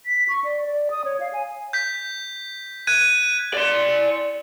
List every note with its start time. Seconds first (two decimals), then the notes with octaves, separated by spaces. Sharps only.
0.06 B6
0.28 C#6
0.44 D5
0.67 D5
0.91 D#6
1.05 C#5
1.20 F5
1.33 G#5
1.73 G6 B6
2.87 F#6 G#6 D#7
3.54 D5 C6